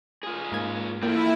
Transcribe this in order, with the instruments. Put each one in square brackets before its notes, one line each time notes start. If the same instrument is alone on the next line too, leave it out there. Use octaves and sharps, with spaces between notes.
[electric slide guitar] F4 G#4
[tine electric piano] G#2 A#3 G#6
[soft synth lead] A#3 [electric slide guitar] C4 F4 A4 [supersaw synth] E4 [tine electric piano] G5